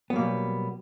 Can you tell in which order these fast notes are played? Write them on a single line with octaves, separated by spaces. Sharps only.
B3 F#3 A#3 B2 G3